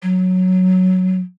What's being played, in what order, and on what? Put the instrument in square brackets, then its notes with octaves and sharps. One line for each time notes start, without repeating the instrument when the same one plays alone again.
[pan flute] F#3